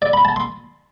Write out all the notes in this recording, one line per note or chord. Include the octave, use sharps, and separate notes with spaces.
D5
B5
A5
C6